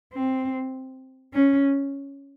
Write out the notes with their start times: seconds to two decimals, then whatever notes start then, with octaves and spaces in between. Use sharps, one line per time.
0.14 C4
1.34 C#4